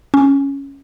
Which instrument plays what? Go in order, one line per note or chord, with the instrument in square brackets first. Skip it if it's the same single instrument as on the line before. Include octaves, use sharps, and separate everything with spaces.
[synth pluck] C#4